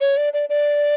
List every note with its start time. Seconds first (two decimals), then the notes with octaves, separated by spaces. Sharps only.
0.01 C#5
0.17 D5
0.33 D5
0.49 D5